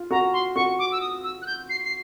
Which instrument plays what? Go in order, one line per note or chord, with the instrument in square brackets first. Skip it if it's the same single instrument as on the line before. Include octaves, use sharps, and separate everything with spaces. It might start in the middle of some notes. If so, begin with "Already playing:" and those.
Already playing: [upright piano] F4
[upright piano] F#4 [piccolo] A#5
[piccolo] C6
[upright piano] F#4 [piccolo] C#6
[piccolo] D6
E6
D#6
E6
F#6
G6
C7
C7